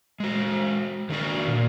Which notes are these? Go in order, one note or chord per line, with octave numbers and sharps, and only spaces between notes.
G#3 F#4
D#3 F#3 D4 F#4 D5
A#2